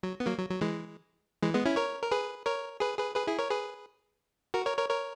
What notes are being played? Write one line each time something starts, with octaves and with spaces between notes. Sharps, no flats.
F#3
B3
F#3 A#3
F#3
F#3
E3 G#3
E3 G#3
G#3 B3
C#4 E4
A#4 C#5
A#4
G#4 B4
A#4 C#5
G#4 B4
G#4 B4
G#4 B4
E4 G#4
A#4 C#5
G#4 B4
F#4 A#4
A#4 C#5
A#4 C#5
A#4 C#5